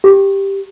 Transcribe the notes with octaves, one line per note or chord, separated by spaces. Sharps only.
G4